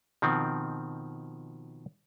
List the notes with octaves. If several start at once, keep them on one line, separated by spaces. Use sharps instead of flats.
B2 D#3 F3 C4